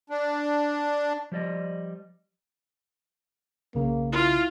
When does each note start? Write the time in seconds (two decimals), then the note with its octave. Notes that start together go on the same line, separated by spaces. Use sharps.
0.10 D4
1.32 F3 G3 D5 D#5
3.75 B1 C#3 A#3
4.12 E4 F4